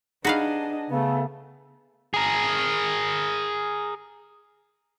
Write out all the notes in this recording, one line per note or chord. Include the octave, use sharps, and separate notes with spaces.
D4 D#4 F#4 G#4 B4 D#5 F5 F#5
C#3 A3 B3
G#4 A#4